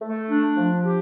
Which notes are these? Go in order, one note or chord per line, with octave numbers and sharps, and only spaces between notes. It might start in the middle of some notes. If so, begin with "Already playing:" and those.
A3
D4
F3
G4